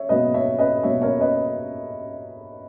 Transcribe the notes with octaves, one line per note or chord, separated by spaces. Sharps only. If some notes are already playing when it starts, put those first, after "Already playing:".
Already playing: C#5 E5
B2 F#3 A#3 B4 D#5
C#5 E5
B4 D#5
B2 F#3 A#3 C#5 E5
A#4 C#5
B4 D#5